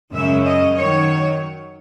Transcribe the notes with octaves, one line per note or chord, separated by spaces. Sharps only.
F#2 C#3 G#3 C#4 E5
D#5
D#3 F#3 C#5